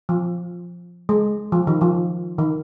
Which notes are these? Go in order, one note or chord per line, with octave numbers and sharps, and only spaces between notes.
F3
G#3
F3
D#3
F3
D#3